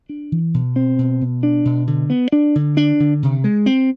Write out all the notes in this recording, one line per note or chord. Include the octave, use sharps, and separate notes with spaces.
D4
E3
B2
C4
B2
B2
D4
B2
D3
B3
D4
D3
D4
D3
C3
G#3
C4